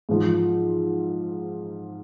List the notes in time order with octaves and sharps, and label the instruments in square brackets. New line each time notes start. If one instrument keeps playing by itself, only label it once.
[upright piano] G#2 F3